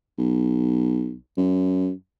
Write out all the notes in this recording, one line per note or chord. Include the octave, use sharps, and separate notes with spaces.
B1
F#2